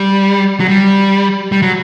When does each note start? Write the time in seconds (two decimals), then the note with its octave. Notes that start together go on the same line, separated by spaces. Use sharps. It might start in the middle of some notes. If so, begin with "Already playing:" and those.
Already playing: G3
0.60 F#3
0.68 G3
1.52 G3
1.62 F#3